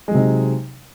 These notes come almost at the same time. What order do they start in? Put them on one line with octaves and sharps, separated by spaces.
G#3 F#3 C3 D#4